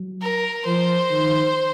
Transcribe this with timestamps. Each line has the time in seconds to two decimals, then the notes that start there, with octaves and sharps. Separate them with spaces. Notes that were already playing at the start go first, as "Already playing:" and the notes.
Already playing: F#3
0.22 A#4
0.66 F3 C5
1.11 D#3